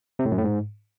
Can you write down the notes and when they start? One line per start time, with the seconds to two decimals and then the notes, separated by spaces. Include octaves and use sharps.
0.19 C3
0.25 A2
0.32 F#2
0.38 A2
0.44 G#2